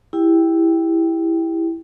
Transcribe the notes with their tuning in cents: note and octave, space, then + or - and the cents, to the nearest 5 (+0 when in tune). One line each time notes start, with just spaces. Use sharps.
E4 +0 G4 +20 G5 +5